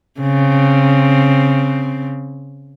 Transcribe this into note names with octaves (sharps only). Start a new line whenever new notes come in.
C#3 C4